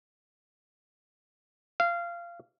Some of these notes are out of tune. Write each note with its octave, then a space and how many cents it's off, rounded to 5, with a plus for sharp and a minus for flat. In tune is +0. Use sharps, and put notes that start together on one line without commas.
F5 -20